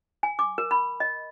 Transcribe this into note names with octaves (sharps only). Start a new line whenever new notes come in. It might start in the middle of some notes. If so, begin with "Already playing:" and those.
G#5
D6
A#4
B5
D#5